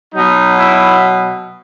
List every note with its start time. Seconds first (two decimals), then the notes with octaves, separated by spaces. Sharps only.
0.14 B2 F#3 D#4
0.57 E4